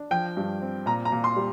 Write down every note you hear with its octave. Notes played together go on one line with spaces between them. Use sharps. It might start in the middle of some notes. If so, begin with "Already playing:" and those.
Already playing: D4
F3 G5
G2
C4
A#2 A#5
A#5
A#2
C6
G3